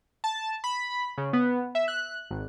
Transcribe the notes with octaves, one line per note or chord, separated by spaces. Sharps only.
A5
B5
C#3
B3
E5
F#6
G#1